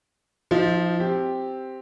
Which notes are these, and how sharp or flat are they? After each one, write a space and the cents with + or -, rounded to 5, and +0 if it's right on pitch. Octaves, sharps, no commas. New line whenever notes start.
F3 +0 D#4 +35 C5 +0
C4 +0 G4 +0